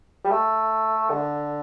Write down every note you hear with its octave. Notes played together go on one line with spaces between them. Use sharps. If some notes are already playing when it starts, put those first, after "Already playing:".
G3
A3
D3